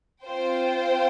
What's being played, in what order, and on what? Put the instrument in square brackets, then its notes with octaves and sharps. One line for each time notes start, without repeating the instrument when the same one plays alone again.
[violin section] C4 F4 C5 G5